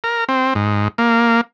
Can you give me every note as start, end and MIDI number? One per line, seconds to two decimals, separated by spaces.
0.04 0.24 70
0.29 0.54 60
0.55 0.88 44
0.98 1.41 58